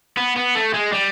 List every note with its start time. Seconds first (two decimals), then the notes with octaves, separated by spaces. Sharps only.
0.17 B3
0.36 B3
0.55 A3
0.74 G#3
0.92 G3